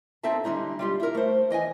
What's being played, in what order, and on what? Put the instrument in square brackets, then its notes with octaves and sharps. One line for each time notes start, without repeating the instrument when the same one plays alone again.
[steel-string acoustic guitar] C4 D#4 A4 E5 A5
D3 G3 G#3 D#4 E4
G3 F4 G4
E4 A#4
A3 C5
E3 D#5 G5 G#5